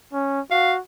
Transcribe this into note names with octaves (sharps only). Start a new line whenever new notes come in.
C#4
F#4 F5